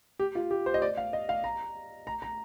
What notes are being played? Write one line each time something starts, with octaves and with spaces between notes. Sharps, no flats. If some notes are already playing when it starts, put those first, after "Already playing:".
G4
F4
G4
C5
D#5
D5
F5
D#5
F5
A#5
A#5
A#5